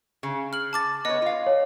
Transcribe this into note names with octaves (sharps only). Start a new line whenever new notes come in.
C#3
F6 F#7
A5 D6 A6
B3 C#5 D#5
F4 F5
C#5